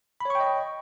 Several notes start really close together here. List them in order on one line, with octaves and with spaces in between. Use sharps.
B5 C#5 C#6 G5 D#5